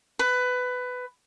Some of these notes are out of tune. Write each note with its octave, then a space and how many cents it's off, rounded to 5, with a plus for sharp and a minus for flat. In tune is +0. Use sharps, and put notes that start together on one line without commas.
B4 +15